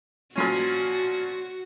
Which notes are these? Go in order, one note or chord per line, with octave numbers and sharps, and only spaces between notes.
A#2 F3 C#4 F#4